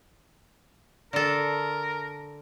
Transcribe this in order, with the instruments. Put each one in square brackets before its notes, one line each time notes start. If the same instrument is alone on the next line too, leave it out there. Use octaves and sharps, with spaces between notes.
[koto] D3 A4 [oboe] A#4